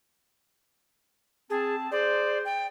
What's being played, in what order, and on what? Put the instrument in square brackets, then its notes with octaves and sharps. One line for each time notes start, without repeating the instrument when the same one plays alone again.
[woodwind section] C4 A5 [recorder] G#4
[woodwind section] G#4 C5 [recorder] D5
[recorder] G5